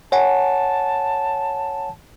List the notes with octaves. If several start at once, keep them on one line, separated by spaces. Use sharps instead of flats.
C#5 F#5 G#5 A5